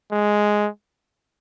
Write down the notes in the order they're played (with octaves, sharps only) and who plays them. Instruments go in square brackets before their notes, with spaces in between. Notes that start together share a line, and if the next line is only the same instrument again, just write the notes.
[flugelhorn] G#3